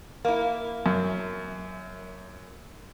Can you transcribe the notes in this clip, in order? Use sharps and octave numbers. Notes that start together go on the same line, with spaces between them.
A#3 E4
F#2